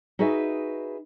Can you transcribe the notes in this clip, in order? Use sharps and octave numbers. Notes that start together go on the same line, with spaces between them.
D#4 F#4 G#4 B4 D#5 E5